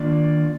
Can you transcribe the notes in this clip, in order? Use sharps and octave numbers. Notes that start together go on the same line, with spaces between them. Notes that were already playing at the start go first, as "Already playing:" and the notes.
Already playing: D#3 A#3 D4 F4 D5